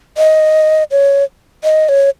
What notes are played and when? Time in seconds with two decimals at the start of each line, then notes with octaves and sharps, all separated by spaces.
0.17 D#5
0.91 C#5
1.64 D#5
1.89 C#5